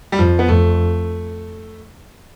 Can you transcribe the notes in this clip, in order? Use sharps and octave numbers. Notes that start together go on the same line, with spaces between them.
G3
F2 F3
B3
F2 A3